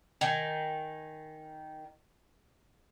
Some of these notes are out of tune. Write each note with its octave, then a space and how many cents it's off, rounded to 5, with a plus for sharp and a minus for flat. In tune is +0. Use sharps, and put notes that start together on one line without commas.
D#3 +0 G#5 +0